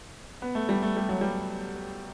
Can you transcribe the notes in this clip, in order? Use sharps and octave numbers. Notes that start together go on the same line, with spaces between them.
B3
A3
G3
A3
G3
F#3
G3